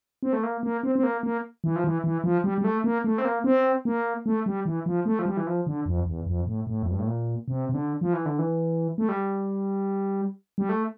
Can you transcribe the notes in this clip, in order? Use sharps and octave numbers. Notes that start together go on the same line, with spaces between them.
C4
A3
A#3
A#3
C4
C4
A#3
A#3
E3
F3
E3
E3
F3
G3
G3
A3
A#3
A3
C4
A#3
C4
A#3
A3
G3
E3
F3
A3
F3
G3
E3
F3
D3
F2
E2
F2
A2
A2
F2
G2
A2
A#2
C3
C3
D3
F3
E3
D3
E3
A3
G3
G3
A3